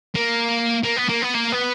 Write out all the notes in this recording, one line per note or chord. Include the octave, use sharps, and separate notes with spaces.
A#3
A#3
B3
A#3
B3
A#3
B3